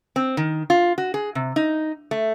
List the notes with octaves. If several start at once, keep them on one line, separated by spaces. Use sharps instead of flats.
C4
D#3
F4
F#4
G#4
C3
D#4
A3